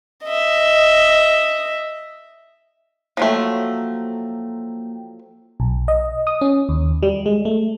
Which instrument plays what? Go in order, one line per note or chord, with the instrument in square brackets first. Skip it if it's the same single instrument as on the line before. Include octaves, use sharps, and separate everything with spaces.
[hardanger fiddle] D#5 E5
[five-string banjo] F3 F#3 A3 [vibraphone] A#3 G5
[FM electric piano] B1
D#5
D#6
C#4
D#2
G3
G#3
A3